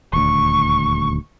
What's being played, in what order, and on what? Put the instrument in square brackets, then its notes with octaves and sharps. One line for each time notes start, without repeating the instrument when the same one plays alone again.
[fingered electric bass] D#1 D2 [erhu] C#6